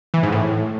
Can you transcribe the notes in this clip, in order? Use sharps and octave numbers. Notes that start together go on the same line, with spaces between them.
E3
G#2
A2